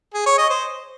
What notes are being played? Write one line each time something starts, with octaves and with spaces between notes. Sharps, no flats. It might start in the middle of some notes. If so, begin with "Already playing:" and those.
G#4
C#5
D#5
C5